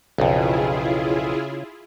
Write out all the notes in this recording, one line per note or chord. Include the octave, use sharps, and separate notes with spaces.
B1 F2 C#3 E4 F4 G#4